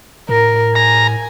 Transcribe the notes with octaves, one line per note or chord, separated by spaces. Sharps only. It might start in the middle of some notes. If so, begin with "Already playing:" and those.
A2 A#4
G#5 A#5